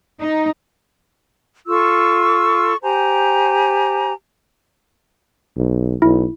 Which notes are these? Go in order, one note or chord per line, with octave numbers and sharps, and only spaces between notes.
D#4
F4 A4 C#6 E6
G4 C5 G#5 A#5
B1
B1 E4